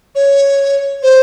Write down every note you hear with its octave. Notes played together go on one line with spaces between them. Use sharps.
C#5
C5